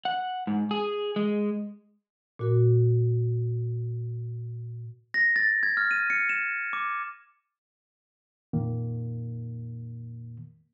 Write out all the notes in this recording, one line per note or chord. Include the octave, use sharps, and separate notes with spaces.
F#5
G#2
G#4
G#3
A#2 F#4 A#4
A#6
A6
G#6
F6
D#7
C#7
E7
D6
F2 A#2 D#3 A#3